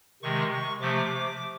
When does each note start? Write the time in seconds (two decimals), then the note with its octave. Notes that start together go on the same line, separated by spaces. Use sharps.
0.23 C3 D#3 G#3 C#6
0.53 C#6
0.81 C3 F3 A3 D6